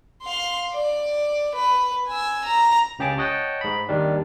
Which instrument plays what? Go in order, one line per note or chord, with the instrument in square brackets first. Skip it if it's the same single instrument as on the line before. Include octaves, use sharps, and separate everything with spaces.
[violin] F5 C6
D5
B4
G#5 E6
A#5
[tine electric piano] C#2 C#3 G4 G#4 A5 D6
C#5 D#5 F#5 G5 A5
G#2 B5
D#2 D#3 G3 D4